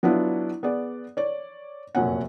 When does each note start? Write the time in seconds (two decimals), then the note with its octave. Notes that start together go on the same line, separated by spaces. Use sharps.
0.03 F#3 B3 D4 E4 F4
0.63 B3 G#4 D5
1.17 C#5 D5
1.95 F1 F#2 A#2 C#4 F#5